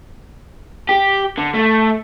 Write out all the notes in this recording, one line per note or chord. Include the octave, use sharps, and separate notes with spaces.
G4
D3
A3